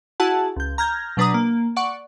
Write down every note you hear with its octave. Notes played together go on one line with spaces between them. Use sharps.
E4 F#4 G#4 F#5 A5
C#2 G6
A#5 F6 G6 G#6 A#6
B2 F#3 D4 B4 A#5 D#6
A#3
D5 F#5 C#6